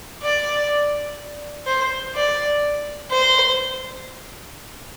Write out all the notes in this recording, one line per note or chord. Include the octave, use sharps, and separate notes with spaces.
D5
C5
D5
C5